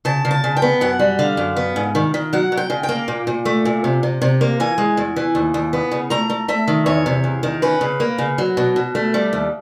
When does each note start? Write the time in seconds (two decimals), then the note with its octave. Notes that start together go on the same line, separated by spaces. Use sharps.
0.05 C#3 A5
0.25 C#3
0.31 A5
0.44 C#3
0.56 G5
0.62 B3
0.81 F#2 F#5
0.99 G3
1.19 D3 F5
1.37 F#2
1.56 B3
1.76 G#2
1.95 D#3
2.14 D#3
2.33 F#3 F#5
2.52 F#3
2.57 G5
2.70 C#3
2.83 G5
2.89 A#3
3.08 A#2
3.27 A#2
3.45 A3
3.65 A#2
3.84 C3
4.03 C3
4.22 C3
4.41 A#3
4.60 E3 G#5
4.78 G#3
4.97 E2
5.16 E3
5.35 D#2
5.54 D#2
5.73 B3
5.92 C#3
6.10 A3 A#5
6.30 A3
6.48 A3 E5
6.68 D#3
6.86 E2 C#5
7.06 C3
7.24 E2
7.43 D#3
7.62 C#4 B4
7.81 C#3
8.00 A#3
8.18 C#3
8.38 F#3
8.57 B2
8.76 B2
8.95 A3
9.14 G3
9.33 D#2